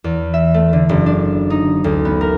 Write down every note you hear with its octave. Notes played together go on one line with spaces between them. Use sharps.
E2
E5
A3
D3
F#1
D4
D#4
D2
B3
A#4